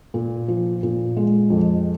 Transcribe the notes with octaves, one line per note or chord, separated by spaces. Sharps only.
A#2
F3
A#2
G#3
F2